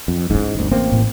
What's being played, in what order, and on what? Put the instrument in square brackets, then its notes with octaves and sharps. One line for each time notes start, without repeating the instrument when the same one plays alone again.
[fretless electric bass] F2
[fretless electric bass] G#2 [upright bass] C#4 E4
[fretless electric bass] G1 D2
A1 A#3 C4
[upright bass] A2